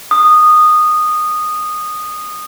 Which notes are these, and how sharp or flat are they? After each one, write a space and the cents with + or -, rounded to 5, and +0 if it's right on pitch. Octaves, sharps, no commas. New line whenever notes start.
D#6 -15